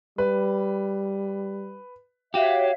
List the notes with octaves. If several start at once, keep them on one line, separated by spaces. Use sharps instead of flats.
G3 B4
F#4 G4 C#5 E5 F5